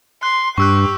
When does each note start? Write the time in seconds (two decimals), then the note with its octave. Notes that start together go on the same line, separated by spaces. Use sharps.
0.23 C6 F#6
0.58 G2 G4 C#6 E6 F#6